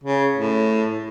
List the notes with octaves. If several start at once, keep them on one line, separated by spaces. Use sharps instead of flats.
C#3
A2